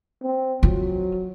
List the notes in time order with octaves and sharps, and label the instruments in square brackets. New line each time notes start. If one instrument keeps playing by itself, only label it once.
[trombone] C4
[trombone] F#3 [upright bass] F4